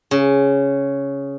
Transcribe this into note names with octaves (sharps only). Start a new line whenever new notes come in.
C#3